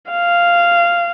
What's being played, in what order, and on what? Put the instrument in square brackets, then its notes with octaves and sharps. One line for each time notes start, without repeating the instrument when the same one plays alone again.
[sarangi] F5